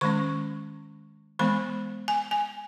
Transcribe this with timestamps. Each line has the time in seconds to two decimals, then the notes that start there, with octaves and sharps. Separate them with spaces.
0.01 D#3 G#3 C#4 C#6
1.39 E3 G#3 B3 B5
2.08 G#5
2.31 G#5